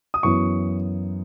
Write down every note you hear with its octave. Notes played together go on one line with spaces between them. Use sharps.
D#6
F#2 E3 B3 C#6